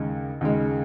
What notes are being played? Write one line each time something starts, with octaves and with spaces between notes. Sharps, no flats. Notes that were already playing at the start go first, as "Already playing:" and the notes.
Already playing: D#2 C#3 G#3
D#2 C#3 G#3